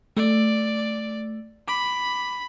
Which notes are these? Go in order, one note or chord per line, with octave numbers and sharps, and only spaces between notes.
A3 D5
B5 D6